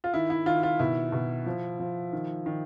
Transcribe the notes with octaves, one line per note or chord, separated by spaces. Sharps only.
F4
D#3 E4
E4
D#3 F4
F4
B2 E4
B2
F3
F3
D#3
D#3